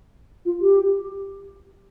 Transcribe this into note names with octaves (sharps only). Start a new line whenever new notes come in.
F4
G4